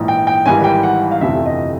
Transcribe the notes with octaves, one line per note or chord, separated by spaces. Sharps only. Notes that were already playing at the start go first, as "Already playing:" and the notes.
Already playing: A#1 G#2 E3
G5
G5
G#1 G#2 E3 G3 G#5
G5
F#5
F5
G1 F2 C3 E3 A3 E5
D#5